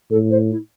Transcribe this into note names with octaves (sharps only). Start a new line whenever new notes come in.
A2 A4
C5
E4